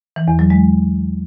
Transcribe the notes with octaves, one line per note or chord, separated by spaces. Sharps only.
E3
E2
F#3
G#3